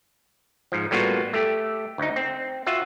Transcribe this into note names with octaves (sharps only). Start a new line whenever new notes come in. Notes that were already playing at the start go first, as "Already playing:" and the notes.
G#2 F3
A2 G3 A#3 B3 F4 F#4
A3 G4
D2 D#4
C4
F4 F#4 E5 F#5